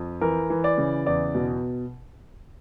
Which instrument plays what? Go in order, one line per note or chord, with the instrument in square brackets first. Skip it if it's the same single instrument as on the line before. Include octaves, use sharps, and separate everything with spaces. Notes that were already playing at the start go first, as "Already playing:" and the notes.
Already playing: [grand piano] F2
E3 A#4
E3
D5
C#3
E2 D5
B2